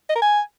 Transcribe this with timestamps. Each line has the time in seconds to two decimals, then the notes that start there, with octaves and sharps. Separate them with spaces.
0.09 D#5
0.16 A#4
0.22 G#5